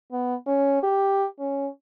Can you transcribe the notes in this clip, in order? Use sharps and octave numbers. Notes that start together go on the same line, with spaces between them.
B3
C#4
G4
C#4